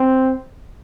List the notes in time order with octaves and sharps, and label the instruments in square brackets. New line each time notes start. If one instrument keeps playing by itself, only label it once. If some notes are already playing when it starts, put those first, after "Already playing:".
Already playing: [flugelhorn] C4